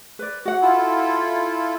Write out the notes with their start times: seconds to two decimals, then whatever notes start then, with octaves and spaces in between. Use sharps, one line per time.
0.19 B4 D5
0.45 F#4 F#5
0.62 E4 F4 A4